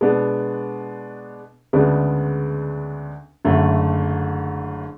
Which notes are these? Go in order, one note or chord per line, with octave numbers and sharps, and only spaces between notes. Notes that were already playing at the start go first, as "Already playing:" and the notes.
B2 G#3 B3 D4
D2 C#3 G#3 B3 D4
F#1 F#2 D3 A3